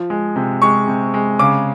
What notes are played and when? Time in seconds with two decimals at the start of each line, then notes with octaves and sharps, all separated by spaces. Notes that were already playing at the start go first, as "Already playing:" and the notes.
Already playing: F3
0.10 G#3
0.36 C3
0.62 G#3 C#6
0.87 C3
1.14 G#3
1.39 C#3 D6